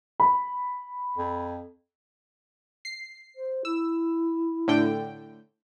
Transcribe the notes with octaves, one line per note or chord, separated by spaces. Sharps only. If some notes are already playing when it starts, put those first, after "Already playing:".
B5
F2
C7
C5
E4 E6
A2 D3 G5